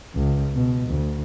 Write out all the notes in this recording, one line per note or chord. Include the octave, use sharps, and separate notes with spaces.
C#2
B2
D2